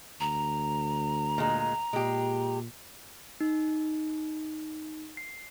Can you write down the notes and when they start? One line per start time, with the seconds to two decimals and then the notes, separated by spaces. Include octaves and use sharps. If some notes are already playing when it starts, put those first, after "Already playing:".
0.20 D2 A#5
1.38 A#2 G#3
1.93 A#2 G#3 G4
3.41 D#4
5.17 C7